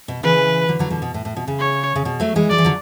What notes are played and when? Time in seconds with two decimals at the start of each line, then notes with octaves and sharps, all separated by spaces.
0.08 B2
0.23 C#3 E3 B4
0.68 D3 F#3
0.79 D3 F#3
0.90 B2 D3
1.02 B2
1.14 A2
1.25 A2
1.36 B2
1.47 C#3
1.59 C#5
1.96 C#3
2.05 B2
2.20 F#3 A3
2.36 E3 G#3
2.50 F#3 D5
2.58 E3
2.65 D3 F#3